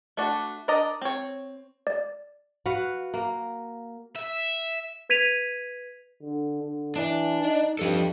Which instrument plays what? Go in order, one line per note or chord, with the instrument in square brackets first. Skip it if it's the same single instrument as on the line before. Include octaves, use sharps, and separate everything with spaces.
[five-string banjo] A3 D4 F#4
D4 A#4 D5 D#5 A#5
C4 C#5
[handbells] D5
[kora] F#4 B4 F5
A#3
[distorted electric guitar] E5
[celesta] B4 G#6 B6 D#7 F7
[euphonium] D3
D3
[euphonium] E3 [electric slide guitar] D4 D5
[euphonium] D#4
[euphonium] G2 [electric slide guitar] F3 A4